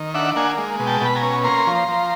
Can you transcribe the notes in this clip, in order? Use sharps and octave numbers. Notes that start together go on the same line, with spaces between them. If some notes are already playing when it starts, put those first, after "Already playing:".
Already playing: D#3
D4 E5 F#5
A#3 F#5 G#5
G#3
B2
G5 A5
B2 B5
G#5 A#5
C#4
A#3 A#5 C6
F3
F3